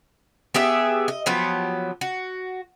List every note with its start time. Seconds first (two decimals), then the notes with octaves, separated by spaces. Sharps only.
0.54 B3 G4 G#4 E5
1.08 D#5
1.26 F3 F#3 B3 G4
2.01 F#4